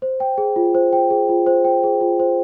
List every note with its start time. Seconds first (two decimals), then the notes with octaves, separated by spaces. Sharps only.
0.02 C5
0.20 G5
0.38 G#4
0.56 F4
0.75 C5
0.93 G5
1.11 G#4
1.29 F4
1.47 C5
1.65 G5
1.84 G#4
2.01 F4
2.20 C5